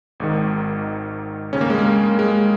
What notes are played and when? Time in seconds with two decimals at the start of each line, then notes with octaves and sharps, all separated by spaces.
0.20 G#1 G#2 D#3
1.53 D#2 C#3 C#4
1.61 A#3
1.70 G#3
1.78 A#3
2.19 G#3